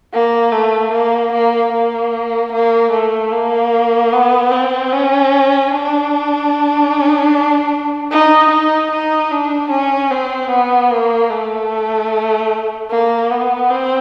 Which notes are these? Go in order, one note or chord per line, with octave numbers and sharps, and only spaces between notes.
A#3
A3
A#3
A#3
A#3
A#3
A3
A#3
B3
C4
C#4
D4
D#4
D#4
D#4
D4
C#4
C4
B3
A#3
A3
A#3
B3
C4